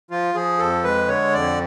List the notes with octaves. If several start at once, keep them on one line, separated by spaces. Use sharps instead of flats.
F3 F4
F3 G#4
F2 A4
G#3 B4
D3 C#5
F2 D5